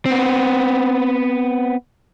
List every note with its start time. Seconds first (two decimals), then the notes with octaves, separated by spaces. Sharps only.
0.06 B3 C4